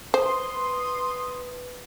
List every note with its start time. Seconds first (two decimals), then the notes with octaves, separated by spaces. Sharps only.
0.14 B4 C5 C6 D#6